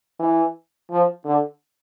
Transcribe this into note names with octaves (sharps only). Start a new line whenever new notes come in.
E3
F3
D3